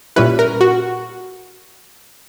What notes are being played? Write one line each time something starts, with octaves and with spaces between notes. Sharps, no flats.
A#2 G3 C#4 E4 B4
A#4
F#4